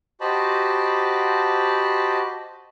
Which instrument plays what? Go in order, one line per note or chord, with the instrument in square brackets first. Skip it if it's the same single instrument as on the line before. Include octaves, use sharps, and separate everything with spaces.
[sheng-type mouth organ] F#4 G4 C5 D#5 A5 B5